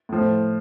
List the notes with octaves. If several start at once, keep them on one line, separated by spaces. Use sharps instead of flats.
A2 F3